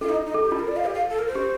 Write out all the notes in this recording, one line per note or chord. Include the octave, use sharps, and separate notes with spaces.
F4 A4
D#4
D#4
A4
G4
F4 A4
A#4
D5
F5
G4
F5
A4
A#4
C5
G4